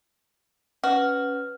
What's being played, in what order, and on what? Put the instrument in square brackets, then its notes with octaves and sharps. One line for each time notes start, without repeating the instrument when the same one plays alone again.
[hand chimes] C#4 B4 F6 [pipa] F#4